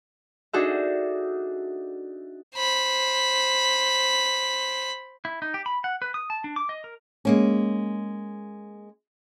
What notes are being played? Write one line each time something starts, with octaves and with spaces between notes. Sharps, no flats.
D4 D#4 F#4 G#4 A4 E5
C5 B5
E4
D#4
G4
B5
F#5
B4
D#6
A5
D4
D6
D#5
A#4
G#3 A#3 C#4